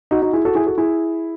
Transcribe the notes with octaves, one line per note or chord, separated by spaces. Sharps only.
D#4 F#4
D#4 F#4
E4 G#4
F#4 A4
E4 G#4
F#4 A4
E4 G#4